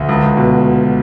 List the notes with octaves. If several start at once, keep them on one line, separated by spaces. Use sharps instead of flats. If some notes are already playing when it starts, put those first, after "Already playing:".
Already playing: D2
C#2
C#2
B2